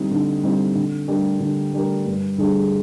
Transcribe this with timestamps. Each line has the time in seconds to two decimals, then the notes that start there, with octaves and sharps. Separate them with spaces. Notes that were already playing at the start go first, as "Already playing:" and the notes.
Already playing: D3 G3 C4 D#4
0.11 D3
0.43 G3 C4 D#4
0.75 D3
1.08 G3 D4 G4 A#4
1.40 D3
1.73 G3 D4 G4 A#4
2.06 G2
2.38 D3 G3 D4 G#4